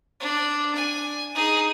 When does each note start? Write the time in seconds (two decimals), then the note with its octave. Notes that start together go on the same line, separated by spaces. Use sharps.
0.20 D4
0.75 G#5
1.35 D#4 G#4